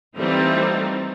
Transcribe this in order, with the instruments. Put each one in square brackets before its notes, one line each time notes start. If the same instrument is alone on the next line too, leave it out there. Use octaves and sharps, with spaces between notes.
[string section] E3 G3 A3 C4 D#4 F4